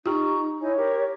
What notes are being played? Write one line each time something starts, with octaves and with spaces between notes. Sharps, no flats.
D#4 F4 G4 A#5 C#6
D#4 E4 C#5 G#5
G4 A#4